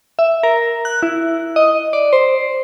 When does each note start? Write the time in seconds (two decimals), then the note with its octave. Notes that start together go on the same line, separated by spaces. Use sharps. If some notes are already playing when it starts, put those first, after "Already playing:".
0.19 E5
0.43 A#4
0.85 F#6
1.03 E4
1.56 D#5
1.93 D5
2.13 C5